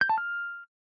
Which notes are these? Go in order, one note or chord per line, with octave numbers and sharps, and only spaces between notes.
G6
A5
F6